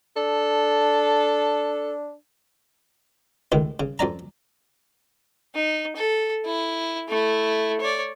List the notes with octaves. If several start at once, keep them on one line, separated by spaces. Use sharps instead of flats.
D4 A4
C#2 A2 D#3
C#3
F2 C#4 D5 A#5
D#4
A4
E4
A3 E4
C#5 D5